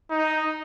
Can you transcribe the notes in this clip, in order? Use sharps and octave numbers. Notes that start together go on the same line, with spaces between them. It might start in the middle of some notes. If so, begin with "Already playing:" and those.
D#4